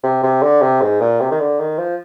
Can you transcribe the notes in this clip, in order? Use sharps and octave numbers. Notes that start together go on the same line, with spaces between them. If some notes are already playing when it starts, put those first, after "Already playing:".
C3
C3
D3
C3
G#2
A#2
C3
D#3
D3
D#3
F3